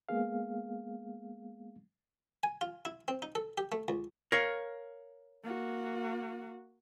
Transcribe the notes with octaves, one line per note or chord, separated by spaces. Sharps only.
G#3 A#3 B3 G#4 F5
G#5
F4
E4
C4
D#4
A4
G4
A3
C#2
A#4 C#5 F5
A#3 F#4